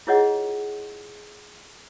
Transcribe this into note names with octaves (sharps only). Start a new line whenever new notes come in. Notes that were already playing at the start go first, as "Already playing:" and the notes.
E4 F4 G#4 C#5 D#5 F#5